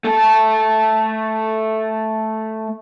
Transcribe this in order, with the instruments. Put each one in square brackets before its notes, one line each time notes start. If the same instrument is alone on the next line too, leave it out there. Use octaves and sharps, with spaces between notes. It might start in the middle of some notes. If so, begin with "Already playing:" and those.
[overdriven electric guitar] A3 A4